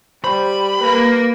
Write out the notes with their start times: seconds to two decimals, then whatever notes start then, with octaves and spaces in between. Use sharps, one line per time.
0.24 G3 C5 B5
0.81 A#3 B4